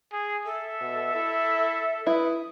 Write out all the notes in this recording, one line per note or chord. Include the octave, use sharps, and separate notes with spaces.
G#4
A4 E5
B2
E4
E4 B4 D#6